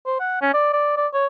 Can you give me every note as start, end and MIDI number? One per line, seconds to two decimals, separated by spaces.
0.06 0.17 72
0.20 0.41 78
0.41 0.51 61
0.53 0.72 74
0.73 0.94 74
0.96 1.07 74
1.13 1.26 73